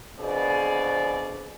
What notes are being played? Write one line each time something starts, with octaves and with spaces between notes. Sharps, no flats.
F2 B2 D3 G#4 C5 D5